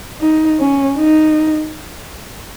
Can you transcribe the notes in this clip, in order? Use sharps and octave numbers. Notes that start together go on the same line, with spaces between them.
D#4
C#4
D#4